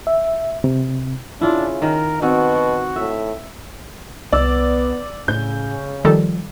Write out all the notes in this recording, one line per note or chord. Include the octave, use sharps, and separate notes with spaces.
E5
C3
C#3 D4 E4 F4
D#3 A#4
B2 D#3 C4 F#4
A2 E5
C2 B3 D5 E6
A2 C#3 C#4 G6
D#3 F3 G3 A4